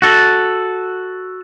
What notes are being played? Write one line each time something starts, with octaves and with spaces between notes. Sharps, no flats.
F#4 A4